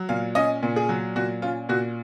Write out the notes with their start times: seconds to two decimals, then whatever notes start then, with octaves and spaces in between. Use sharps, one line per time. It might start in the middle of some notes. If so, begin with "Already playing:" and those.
Already playing: F#3
0.09 A#2 F5
0.35 C#4 D#5
0.63 A#2
0.76 G#4
0.89 F#3
1.16 A#2 F#4
1.42 C#4 F4
1.69 A#2 F#4